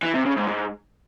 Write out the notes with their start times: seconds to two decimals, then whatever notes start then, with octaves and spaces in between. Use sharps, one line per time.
0.02 E3
0.14 C3
0.26 C#3
0.37 G#2
0.49 G#2